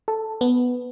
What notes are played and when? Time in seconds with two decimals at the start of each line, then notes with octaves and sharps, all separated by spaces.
0.08 A4
0.41 B3